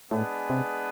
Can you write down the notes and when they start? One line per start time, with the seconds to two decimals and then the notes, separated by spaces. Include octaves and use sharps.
0.11 A2 G#3 B3 D4 G#4 B4
0.50 C3